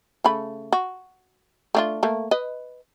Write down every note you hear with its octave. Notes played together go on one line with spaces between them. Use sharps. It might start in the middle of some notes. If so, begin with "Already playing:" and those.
C#3 A3 B5
F#4
A3 D4 F4
A3 A#3
B4 D#5